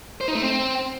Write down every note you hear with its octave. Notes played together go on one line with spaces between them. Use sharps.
C5
D#4
A3
C4